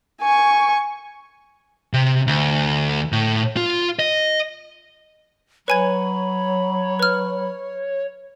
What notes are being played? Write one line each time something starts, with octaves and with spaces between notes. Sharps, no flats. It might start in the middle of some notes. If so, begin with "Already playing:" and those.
G#5 C#6
C3
D2
A2
F4
D#5
F#3 B4 C#5 G#5 B5 G#6
B4 F6